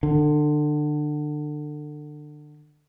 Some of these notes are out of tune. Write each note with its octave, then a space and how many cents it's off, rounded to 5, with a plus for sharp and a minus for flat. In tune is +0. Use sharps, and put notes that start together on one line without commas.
D3 +25